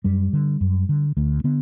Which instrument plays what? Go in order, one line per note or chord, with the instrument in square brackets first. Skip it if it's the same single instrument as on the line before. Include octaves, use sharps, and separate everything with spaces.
[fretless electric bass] F#2 G3
D3
F#2
D3
D2 A3
D3 B3